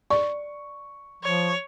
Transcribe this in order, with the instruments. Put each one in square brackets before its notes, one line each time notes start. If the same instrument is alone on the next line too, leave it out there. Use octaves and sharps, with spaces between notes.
[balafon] D5 [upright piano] C#6
[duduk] F3 [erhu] C#5